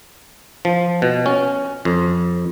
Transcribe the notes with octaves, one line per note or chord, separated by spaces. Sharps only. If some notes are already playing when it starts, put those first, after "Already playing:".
F3
B2
C#4
F2